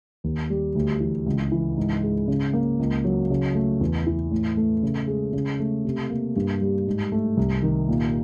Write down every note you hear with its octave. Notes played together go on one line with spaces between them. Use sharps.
D#2
G3
D2
E3
C#2
E3
G#2
G#3
C#3
A#3
C#2
F#3
C#3
A3
E2
E3
A2
A3
C#3
G#3
C#3
A3
C3
A#3
G2
G3
G#2
A3
C2
D#3
A#2